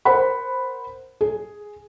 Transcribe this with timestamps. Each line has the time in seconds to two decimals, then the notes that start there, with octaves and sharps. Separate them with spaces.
0.05 A#4 C5 F#5 B5
1.21 G#4